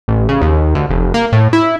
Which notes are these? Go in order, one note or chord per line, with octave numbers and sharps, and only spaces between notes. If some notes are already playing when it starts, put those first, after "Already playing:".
A1
C#3
D#2
D2
F1
A#3
A2
E4